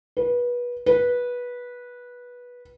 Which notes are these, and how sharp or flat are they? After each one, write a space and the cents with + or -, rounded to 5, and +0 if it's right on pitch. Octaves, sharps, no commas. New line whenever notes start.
B4 -25
B4 -15